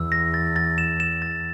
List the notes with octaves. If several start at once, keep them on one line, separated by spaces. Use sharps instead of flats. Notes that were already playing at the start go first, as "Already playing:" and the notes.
Already playing: E2 E6
A#6
A6
A6
E7
E7
A6